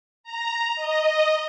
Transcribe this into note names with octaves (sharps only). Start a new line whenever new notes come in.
A#5
D#5